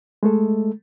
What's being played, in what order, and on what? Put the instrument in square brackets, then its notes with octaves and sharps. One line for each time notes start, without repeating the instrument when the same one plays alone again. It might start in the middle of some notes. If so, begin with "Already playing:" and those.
[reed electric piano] G#3 A3 A4